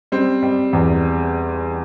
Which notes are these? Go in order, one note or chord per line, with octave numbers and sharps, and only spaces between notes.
G3 C4
G3
E2